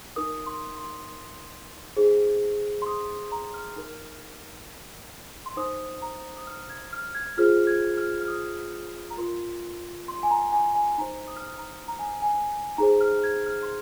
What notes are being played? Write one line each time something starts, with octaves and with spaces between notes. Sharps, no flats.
D#4 A#4 D#6
C6
C6
D#4 G#4 C5
C6
D#6
A#5
F6
D#4 A#4
C6
D#4 C5 D#6
A#5
D#6
F6
G#6
F6
G#6
F4 G#4 C5 F6
G#6
F6
F6
D#6
A#5
F4 A#4 C6
C6
G#5
A#5
G#5
G#5
D#4 C5 A#5
D#6
F6
D#6
A#5
A#5
G#5
G#5
D#4 G#4 C5 A#5
F6
G#6
F6
C6